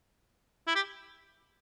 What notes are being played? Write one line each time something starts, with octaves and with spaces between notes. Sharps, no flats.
E4
G4